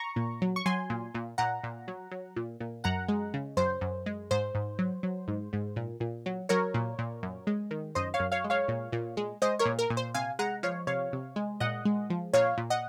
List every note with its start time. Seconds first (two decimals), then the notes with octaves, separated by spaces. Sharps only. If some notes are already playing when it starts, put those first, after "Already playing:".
Already playing: A#5 C#6
0.16 A#2
0.42 F#3
0.56 C#6
0.66 F#3 G#5 C6
0.90 A#2
1.14 A#2
1.38 A#2 F#5 A#5
1.63 A#2
1.88 F#3
2.11 F#3
2.36 A#2
2.60 A#2
2.84 F#2 F#5 A#5
3.08 G#3
3.34 C#3
3.57 F#2 C5
3.81 F#2
4.06 G#3
4.31 G#2 C5
4.55 G#2
4.79 F#3
5.03 F#3
5.28 G#2
5.53 G#2
5.76 A#2
6.00 A#2
6.26 F#3
6.49 F#3 A#4 C#5
6.74 A#2
6.99 A#2
7.23 F#2
7.47 G#3
7.71 D#3
7.95 F#2 C5 D#5
8.14 C#5 F5
8.20 F#2
8.32 C#5 F5
8.44 G#3
8.50 C#5 F5
8.68 A#2
8.92 A#2
9.17 G#3
9.42 G#3 C5 D#5
9.59 A#4 C#5
9.65 A#2
9.79 A#4
9.90 A#2
9.97 C5
10.14 C3 F5 G#5
10.39 G#3 F#5 A#5
10.63 F3 C#5 F5
10.87 C3 C#5 F5
11.13 C3
11.36 G#3
11.60 A#2 D#5 F#5
11.85 G#3
12.10 F3
12.33 A#2 C#5 F5
12.58 A#2
12.70 D#5 F#5